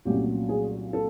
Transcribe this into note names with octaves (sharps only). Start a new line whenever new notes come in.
C2 A#2 F#3 A3 C#4 G4
G#4
A4